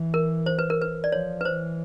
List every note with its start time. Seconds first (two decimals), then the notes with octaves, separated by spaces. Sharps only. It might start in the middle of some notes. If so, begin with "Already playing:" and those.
Already playing: E3
0.14 A#4
0.46 C5
0.59 B4
0.70 A#4
0.82 B4
1.04 D5
1.12 F3 C#5
1.41 B4
1.45 E3 C5